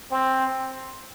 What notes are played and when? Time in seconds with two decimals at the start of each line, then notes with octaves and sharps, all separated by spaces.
0.11 C4